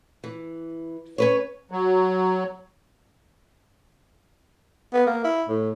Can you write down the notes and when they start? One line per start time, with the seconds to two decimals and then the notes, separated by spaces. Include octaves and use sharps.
0.24 E3
1.18 C#4 B4 C#5
1.71 F#3
4.94 B3
5.07 A#3
5.24 E4
5.49 A2